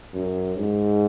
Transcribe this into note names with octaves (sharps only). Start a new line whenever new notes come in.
F#2
G#2